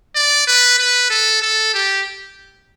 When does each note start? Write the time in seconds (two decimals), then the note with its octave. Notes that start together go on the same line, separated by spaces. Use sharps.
0.16 D5
0.47 B4
0.78 B4
1.10 A4
1.42 A4
1.74 G4